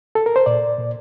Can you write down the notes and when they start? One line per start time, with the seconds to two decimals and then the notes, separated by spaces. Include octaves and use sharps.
0.15 A4
0.26 A#4
0.36 C5
0.46 A#2 D5
0.78 A#2